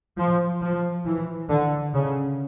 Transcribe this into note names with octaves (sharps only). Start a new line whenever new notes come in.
F3
F3
E3
D3
C#3